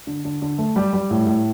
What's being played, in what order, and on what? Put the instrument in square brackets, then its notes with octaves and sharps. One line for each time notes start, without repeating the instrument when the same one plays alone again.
[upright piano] D3
D3
D3
A3
G3
G3
A2
A2